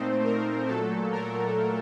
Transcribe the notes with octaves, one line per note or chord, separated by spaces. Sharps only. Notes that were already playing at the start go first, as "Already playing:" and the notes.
Already playing: A#2 A3 C4 D#4 C5
A#4
A#2 F#3 A3 A4
A#4